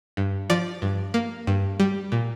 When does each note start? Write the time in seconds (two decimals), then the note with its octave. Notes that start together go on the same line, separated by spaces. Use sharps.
0.17 G2
0.50 F3 D5
0.82 G2
1.14 A#3
1.47 G2
1.80 G3
2.12 A#2